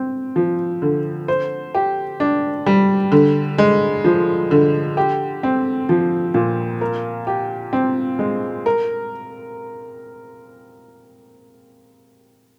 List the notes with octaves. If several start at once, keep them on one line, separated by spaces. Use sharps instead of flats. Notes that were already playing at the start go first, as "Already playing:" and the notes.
Already playing: C4
F3
D3
C5
G4
D4
G3
D3
G#3
F3
D3
G4
C4
F3
A#2
A#4
G4
C4
G#3
A#4